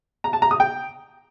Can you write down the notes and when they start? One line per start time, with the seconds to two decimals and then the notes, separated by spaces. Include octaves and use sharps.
0.24 A#5
0.33 A5
0.42 A#5
0.51 D#6
0.60 G5